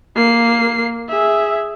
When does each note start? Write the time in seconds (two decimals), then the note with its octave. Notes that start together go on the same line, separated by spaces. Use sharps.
0.16 A#3 C7
1.09 G#4 E5